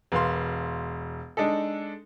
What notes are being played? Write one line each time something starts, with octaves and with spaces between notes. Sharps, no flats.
E1 B4 F5 C6
G#3 D4 D#4 A4